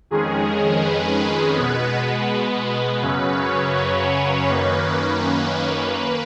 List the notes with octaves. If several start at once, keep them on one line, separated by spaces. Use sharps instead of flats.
F2 D#3 G#3 C#4 G#4
B4
B2 G#3 B3
F#2 C#3 F#3 C#4 B4
C#5
B4
C#5
F#2 D#3 A#3 C#4 B4
A#3 B4